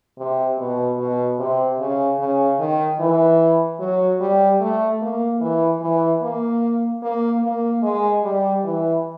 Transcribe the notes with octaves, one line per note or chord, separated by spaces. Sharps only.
C3
B2
B2
C3
C#3
C#3
D#3
E3
F#3
G3
A3
A#3
E3
E3
A#3
A#3
A#3
G#3
G3
E3